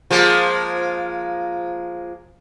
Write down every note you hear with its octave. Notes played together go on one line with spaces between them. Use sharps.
F3 G#3 A#3